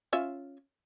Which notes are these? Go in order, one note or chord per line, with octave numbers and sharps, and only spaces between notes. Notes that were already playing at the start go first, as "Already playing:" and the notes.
C#4 F4 E5